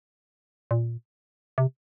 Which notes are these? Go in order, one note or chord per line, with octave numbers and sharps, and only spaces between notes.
A#2
C3